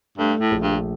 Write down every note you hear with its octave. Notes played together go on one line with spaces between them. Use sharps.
G2 A3
A2
A#1
G2